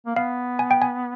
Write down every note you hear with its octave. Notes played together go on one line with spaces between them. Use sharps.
A#3
B3 F5
G#5
G5
G#5